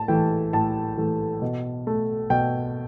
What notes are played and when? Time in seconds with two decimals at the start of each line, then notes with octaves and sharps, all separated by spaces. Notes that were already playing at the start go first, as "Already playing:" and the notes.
Already playing: A2 A5
0.08 E3 A3 G5
0.53 A2 A5
0.98 E3 A3
1.42 B2
1.87 A3
2.30 B2 G5